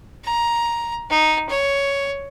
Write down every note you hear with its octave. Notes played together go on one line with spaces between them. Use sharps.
A#5
D#4
C#5